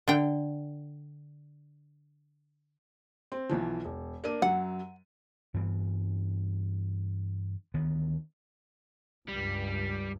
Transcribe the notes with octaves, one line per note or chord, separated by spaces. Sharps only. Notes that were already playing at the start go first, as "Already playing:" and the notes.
D3 G5
C4
B1 E3 F3
E1
A#3 D4 D#7
F#2 F#3 F#5
G2 E3 B3
D2 D#3 B3
C#2 G2 G3